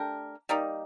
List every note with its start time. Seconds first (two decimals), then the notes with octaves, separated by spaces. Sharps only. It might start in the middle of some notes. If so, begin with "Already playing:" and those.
Already playing: A3 D4 G4 A#4
0.49 G3 A#3 D#4